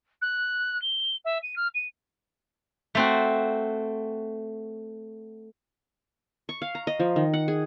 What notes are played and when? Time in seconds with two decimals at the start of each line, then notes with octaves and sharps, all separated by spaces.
0.22 F#6
0.82 G7
1.25 E5
1.43 D#7
1.56 F6
1.75 D#7
2.95 A3 C4 F#4
6.49 C#6
6.62 F5
6.75 A#5
6.87 D#5
7.00 F3
7.16 D#3
7.34 F#5
7.48 G#4